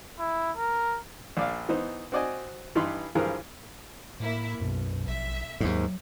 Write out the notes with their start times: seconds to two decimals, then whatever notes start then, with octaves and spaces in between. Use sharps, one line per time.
0.19 E4
0.57 A#4
1.37 A#1 D5 F5
1.69 E3 B3 D#4 C5
2.12 C4 F#4 D5 D#5 G#5
2.75 G2 E3 D#4 B5 C6
3.15 G2 E3 F3 G#4 A#4
4.20 A2 A#3 E4
4.60 B1 F#2
5.08 A#1 E5
5.61 D#2 G#2 F#3